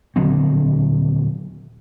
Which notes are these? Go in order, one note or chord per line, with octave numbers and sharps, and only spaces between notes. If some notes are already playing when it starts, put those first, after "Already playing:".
D#1 D3 F#3 C4